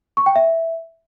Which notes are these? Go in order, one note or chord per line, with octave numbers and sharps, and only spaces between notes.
C#6
G5
E5